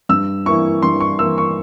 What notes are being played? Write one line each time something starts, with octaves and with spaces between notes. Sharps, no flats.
G2 E6
E3 A#3 E4 C#6
G2 C6
C#6
E3 A#3 E4 E6
C#6